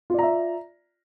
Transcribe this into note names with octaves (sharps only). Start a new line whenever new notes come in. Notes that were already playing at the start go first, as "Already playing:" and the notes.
F4 D5 E5 A#5